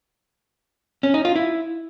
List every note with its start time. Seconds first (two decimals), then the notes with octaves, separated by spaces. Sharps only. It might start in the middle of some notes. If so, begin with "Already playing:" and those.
1.03 C#4
1.14 D#4
1.25 F4
1.36 E4